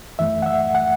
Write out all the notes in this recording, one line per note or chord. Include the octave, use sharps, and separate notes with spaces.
F#2 E3 A3 E5
F#5
E5
F#5